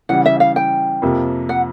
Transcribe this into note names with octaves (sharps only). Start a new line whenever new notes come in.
C#3 E3 G3 F#5
E5
F5
G5
F2 C3 F3 A#3
F#5